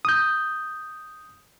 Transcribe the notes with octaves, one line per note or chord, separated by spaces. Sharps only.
D#6 G6